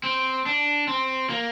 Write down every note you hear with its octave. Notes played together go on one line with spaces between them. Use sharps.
C4
D4
C4
A#3